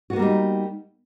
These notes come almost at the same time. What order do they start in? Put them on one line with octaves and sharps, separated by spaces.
F#4 B3 A#3 G3 D#4